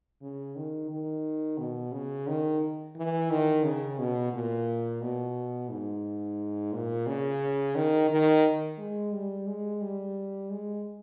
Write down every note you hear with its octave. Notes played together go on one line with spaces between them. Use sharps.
C#3
D#3
D#3
B2
C#3
D#3
E3
D#3
C#3
B2
A#2
B2
G#2
A#2
C#3
D#3
D#3
G#3
G3
G#3
G3
G#3